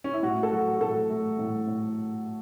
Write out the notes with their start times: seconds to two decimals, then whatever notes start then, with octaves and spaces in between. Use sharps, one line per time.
0.04 C#4
0.13 E4
0.23 A2 F#4
0.43 A4
0.52 F#3 F#4
0.76 F#4
0.81 A2 A4
1.10 A3
1.39 A2
1.67 A2